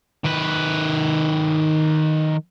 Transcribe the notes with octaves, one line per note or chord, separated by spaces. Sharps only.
D#3 B4